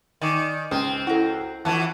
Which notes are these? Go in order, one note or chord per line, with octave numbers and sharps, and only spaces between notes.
D#3 D5 G#5 D6
C#2 C4 D#5
E4 F#4 A4 A#5
F2 E3 F#5 A5